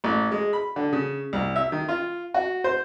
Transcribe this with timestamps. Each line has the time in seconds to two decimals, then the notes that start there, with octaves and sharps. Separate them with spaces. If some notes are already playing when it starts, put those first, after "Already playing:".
0.04 A1
0.31 G#3
0.53 B5
0.76 D3
0.93 C#3
1.33 C2
1.56 E5
1.72 D#3
1.89 F4
2.34 F#4
2.64 C5